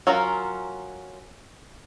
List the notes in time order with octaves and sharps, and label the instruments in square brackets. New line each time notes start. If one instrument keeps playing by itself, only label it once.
[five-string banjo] F#3 C#4 F4 F#4 A#4